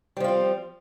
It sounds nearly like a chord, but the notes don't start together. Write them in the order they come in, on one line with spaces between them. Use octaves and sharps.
G3 F3 F4 C4